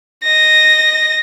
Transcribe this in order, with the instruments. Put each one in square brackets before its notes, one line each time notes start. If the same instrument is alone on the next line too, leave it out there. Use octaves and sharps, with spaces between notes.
[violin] D#5 A#6